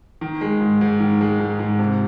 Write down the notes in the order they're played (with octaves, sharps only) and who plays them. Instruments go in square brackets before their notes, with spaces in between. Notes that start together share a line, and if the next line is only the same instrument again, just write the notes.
[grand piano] D#3
G#3
G#2
G#2
D#3
G#3
G#2
G#2
C3